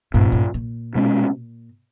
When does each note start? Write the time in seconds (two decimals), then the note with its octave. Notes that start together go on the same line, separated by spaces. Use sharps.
0.14 G2 A#2 A#3 C#4
0.23 E2
0.32 G2
0.54 A#2
0.95 B2 G#3 C#4